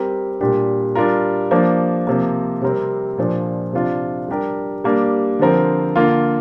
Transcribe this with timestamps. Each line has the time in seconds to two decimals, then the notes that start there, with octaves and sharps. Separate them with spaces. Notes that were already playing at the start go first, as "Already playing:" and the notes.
Already playing: G3 C4 G4 A#4
0.41 A#2 G3 D4 G4
0.95 G3 D4 F4 A#4
1.51 F3 A#3 D4
2.07 C3 F3 A#3
2.62 C3 G3 C4 A#4
3.18 A#2 F3 D4
3.73 C3 F3 D4 F4
4.28 G3 D4 G4 A#4
4.84 G3 A#3 D4
5.39 D3 F3 C4 A#4
5.96 D3 A#3 F4